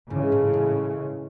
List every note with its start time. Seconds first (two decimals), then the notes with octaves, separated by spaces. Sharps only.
0.10 G#2 C#3 E3 G#3
0.32 A2
0.53 A2